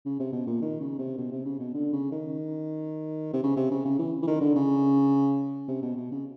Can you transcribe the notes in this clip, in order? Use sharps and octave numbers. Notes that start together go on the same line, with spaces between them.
C#3
C3
B2
A#2
D#3
C#3
C3
B2
C3
C#3
B2
D3
C#3
D#3
C3
C#3
C3
C#3
C#3
E3
E3
D#3
D3
C#3
C3
B2
B2
C#3